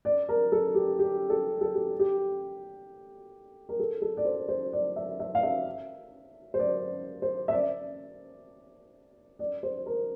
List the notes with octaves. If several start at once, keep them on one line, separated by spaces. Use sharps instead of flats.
D5
A#4
A4
G4
G4
A4
A4
G4
G4
A#4
A4
A4
D5
C5
C5
D5
E5
E5
F5
E5
C5
D5
C5
E5
D5
D5
C5
A#4